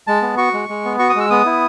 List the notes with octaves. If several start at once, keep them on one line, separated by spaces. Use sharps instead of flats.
G#3 A5
B3
F#4 C#6
G#3
G#3
B3
F#4 C#6
D#6
G#3 E6
B3 D#6
E4